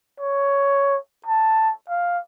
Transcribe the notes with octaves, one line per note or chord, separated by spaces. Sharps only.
C#5
A5
F5